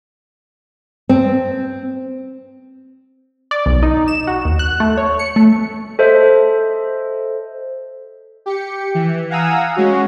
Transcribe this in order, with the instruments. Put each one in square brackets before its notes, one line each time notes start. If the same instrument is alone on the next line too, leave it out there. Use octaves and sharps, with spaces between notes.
[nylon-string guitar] C4
[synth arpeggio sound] D5
B1
D#4
E7
F#4
D#2
F#6
A3
C#5
C#7
A3
[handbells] A4 C5 D#5 E5
[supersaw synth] G4 C#7
E3
F5 F#5 G#5 A#5 D#6 E6
G#3 C#4 F#4